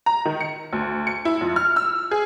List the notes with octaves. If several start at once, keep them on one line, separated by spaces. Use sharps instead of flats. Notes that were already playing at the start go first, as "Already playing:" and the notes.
A#5
D#3
C#7
D2
C#7
E4
F2
F6
E6
G#4